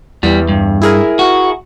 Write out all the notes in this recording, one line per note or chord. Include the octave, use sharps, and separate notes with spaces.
E2 E3 G3
G2
E4 G#4 A#4
F#4